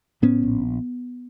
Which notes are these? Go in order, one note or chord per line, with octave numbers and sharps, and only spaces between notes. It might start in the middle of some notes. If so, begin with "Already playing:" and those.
A2 B3 C#4
A#1